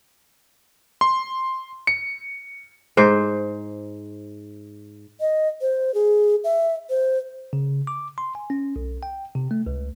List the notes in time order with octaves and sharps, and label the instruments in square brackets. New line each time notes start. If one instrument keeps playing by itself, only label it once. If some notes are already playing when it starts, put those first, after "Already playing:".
[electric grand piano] C6
C#7
[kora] G#2 C5
[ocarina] D#5
C5
G#4
E5
C5
[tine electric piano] C#3
D6
C6
G#5
C#4
B1
G5
C3
A3
C#2